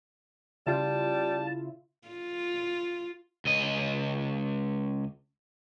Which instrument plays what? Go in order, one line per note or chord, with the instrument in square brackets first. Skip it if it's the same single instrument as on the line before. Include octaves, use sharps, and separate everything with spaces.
[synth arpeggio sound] C#3 E4 F4 [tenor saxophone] G3 [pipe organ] A5
[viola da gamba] F4
[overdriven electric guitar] C#2 D#5